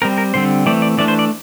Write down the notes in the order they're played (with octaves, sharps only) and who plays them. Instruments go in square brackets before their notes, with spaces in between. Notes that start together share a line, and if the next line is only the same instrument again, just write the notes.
[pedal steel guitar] G3 C4 A#4
A#4
D3 G3 C4 C5
E3 A3 C4 D5
D5
E3 A3 D4 D5
C5
D5